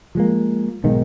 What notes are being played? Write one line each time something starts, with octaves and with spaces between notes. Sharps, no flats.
F3 G#3 A#3
B1 G#2 D#3